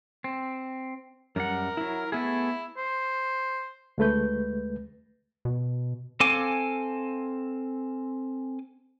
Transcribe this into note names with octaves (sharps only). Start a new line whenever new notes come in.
C4
F#2 G3 A#4 F#5
F#3 E4
A3 B3 E4 G#4
C5
D2 G#3 A3 B4 G6
B2
C4 A4 F5 G#5 D6